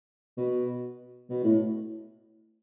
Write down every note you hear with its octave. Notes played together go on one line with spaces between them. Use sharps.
B2
B2
A2